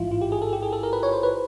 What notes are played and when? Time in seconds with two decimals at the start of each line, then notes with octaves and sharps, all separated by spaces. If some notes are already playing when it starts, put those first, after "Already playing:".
Already playing: A1 G#2 E3 E4 F4
0.11 F4
0.21 G4
0.32 G#4
0.42 A4
0.53 G4
0.62 G#4
0.73 A4
0.83 A#4
0.93 B4
1.03 C#5
1.13 C5
1.23 B4